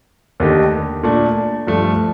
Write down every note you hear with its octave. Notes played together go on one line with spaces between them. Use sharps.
D#2 D3 A3 D#4 G4
A#2 A3 D4
G2 F3 A3 D4